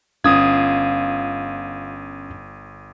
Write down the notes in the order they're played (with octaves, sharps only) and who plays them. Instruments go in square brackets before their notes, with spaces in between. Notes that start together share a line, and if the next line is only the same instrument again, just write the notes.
[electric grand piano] G1 D#6 G#6 [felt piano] C#4 [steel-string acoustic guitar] F4